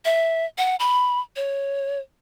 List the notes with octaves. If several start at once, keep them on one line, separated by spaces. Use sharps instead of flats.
E5
F#5
B5
C#5